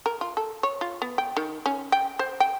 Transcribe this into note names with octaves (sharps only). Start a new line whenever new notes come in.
A#4
F4
A4
C#5
F4
B3
G5
D#3
C#4
G5
C5
G5